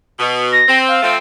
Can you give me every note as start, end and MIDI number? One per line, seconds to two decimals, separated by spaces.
0.19 0.61 47
0.52 0.78 94
0.68 0.99 60
0.88 1.12 77
1.03 1.17 53
1.03 1.17 57
1.03 1.17 60